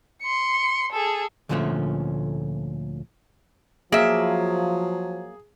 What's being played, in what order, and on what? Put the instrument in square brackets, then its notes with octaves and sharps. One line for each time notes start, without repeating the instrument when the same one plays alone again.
[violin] C6 C#7
G#4 A4
[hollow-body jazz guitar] D2 A#2 D3 F3 A3 C#4
[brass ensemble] F3 [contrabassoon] F#3 [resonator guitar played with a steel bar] A#3 E5 [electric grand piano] G#4